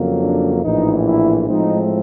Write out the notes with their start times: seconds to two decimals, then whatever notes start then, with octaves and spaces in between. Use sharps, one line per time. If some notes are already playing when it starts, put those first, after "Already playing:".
Already playing: F2 C#3 F#3 A#3
0.20 D4
0.63 A#1 A2 E3 D#4
1.05 E4
1.48 A2 F3 G#3 C4 D#4